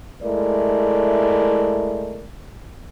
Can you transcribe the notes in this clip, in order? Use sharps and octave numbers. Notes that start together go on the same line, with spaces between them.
G#3 A3 E4 A#4 D5